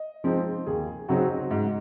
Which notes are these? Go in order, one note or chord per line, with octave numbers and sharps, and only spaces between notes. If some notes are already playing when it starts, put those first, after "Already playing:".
Already playing: D#5
F3 G#3 C4 D#4
D#2 G#4
C#3 F#3 C4 D#4 F#4
G#2